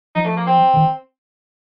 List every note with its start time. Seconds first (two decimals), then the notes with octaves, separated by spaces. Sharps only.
0.15 F3 D#4
0.25 A3
0.37 A#3
0.47 C4
0.73 D3
0.77 D#3